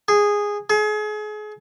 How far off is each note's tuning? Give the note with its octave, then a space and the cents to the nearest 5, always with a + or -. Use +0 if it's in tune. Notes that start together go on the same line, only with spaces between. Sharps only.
G#4 -10
G#4 +35